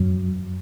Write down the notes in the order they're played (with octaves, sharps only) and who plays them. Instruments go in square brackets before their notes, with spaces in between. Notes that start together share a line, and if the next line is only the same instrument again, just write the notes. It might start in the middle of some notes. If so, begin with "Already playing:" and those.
Already playing: [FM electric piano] F#2 F#3